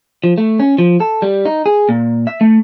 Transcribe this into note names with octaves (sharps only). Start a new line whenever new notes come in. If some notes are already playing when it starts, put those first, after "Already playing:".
F3
A3
C#4
F3
A4
G3
D#4
G#4
A#2
E5
A3